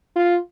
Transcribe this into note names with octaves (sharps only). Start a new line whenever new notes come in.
F4